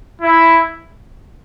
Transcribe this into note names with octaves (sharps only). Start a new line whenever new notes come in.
E4